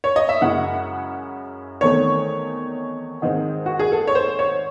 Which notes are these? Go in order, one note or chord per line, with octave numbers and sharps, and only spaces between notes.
C#5
D#5
E5
F#2 C#3 G#3 C#4 E4 F#5
E2 D#3 A3 C4 C#5
G#2 D#3 G#3 C4
F#4
G#4
A4
C#5
C5
C#5